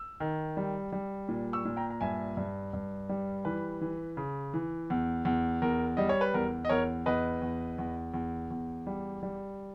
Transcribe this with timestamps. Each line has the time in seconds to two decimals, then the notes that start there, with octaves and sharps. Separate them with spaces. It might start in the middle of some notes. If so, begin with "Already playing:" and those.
Already playing: E6
0.20 D#3
0.57 G3
0.93 G3
1.29 A#2
1.53 C#6 E6
1.65 A#2
1.77 G5 A#5
1.90 A#5
2.01 G2 E5 G#5
2.37 G2
2.73 G2
3.09 G3
3.45 E3 B4
3.81 E3
4.17 C#3
4.54 E3
4.90 E2
5.25 E2
5.62 E2 A#4
5.97 G3 D#5
6.09 C#5
6.21 B4
6.34 E2 A#4
6.65 D#5
6.69 E2 A#4 C#5
7.06 E2 B4 D#5
7.42 E2
7.79 E2
8.14 E2
8.51 E2
8.87 G3
9.23 G3